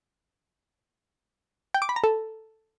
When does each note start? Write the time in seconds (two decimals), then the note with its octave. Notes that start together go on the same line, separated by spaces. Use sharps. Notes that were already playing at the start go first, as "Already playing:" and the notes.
1.74 G5
1.82 D6
1.89 B5
1.96 A#5
2.04 A4